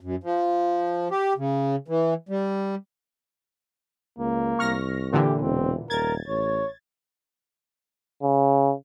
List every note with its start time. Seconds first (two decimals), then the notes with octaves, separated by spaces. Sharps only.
0.01 F#2
0.24 F3
1.11 G4
1.38 C#3
1.88 E3
2.29 G3
4.18 C#2 A#3
4.59 C2 C#6 F6 A#6
5.13 A#2 D3 E3 G4
5.41 E1 C4
5.90 D#1 A#4 G#6 A6
6.28 A1 C#5
8.22 C#3